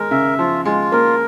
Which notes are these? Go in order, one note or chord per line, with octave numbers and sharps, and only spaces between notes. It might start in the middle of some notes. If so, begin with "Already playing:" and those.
Already playing: G#3 A#4
C#3 E5
F3 F4
G#3 F4
A#3 A#4